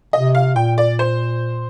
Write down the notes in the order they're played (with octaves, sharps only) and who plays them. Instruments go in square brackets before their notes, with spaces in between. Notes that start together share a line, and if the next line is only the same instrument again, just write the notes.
[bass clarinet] C3 [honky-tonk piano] D#5
[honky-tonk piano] F5
[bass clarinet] A#2 [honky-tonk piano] G5
[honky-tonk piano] D5
C5